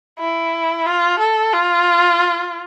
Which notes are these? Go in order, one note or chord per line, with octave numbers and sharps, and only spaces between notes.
E4
F4
A4
F4